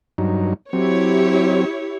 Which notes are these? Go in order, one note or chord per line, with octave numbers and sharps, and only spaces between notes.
G2 F#3 D#4
F#3 C4 E4 G4 C#5